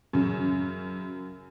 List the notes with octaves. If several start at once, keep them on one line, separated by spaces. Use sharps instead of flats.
F#2 C#3